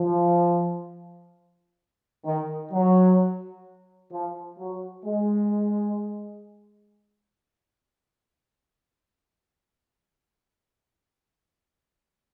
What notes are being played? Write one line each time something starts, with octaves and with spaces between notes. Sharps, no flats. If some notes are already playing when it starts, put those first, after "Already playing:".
Already playing: F3
D#3
F#3
F3
F#3
G#3